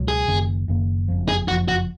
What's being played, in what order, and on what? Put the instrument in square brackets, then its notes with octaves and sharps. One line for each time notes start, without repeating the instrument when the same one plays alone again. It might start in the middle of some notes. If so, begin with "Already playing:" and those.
Already playing: [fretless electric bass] C#2 B2 F#3
[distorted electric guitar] G#4
[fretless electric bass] F#1 F#2 D#3 A#3
F#1 F#2 D#3 A#3
F#1 F2 F3
[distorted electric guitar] G#4
[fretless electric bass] F#1 F2 F3 [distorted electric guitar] F#4
[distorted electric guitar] F#4